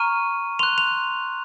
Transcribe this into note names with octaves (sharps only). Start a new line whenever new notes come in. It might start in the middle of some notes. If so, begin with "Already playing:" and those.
Already playing: A#5 C#6 F6 D#7
C6 F#6 F7
F7